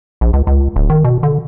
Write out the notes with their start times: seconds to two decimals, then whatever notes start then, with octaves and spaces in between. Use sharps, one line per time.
0.21 A#1
0.33 C#2
0.47 C#2
0.76 D1
0.90 D#3
1.05 B2
1.23 D3